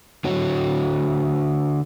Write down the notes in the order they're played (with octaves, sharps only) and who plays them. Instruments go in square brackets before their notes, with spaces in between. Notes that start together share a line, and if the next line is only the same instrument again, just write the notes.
[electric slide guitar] D3 F#4 C#5